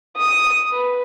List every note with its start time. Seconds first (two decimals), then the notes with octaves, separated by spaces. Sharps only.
0.17 D#6
0.71 B4